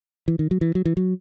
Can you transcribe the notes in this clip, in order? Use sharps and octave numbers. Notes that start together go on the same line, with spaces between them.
E3
D#3
F#3
E3
F#3
E3
F#3